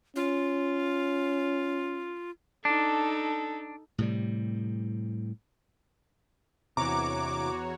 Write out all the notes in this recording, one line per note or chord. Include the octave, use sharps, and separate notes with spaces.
C#4 F4
D4 D#4 A4
A2 C3 G3
E2 C3 E3 F#4 C#5 A#5 D6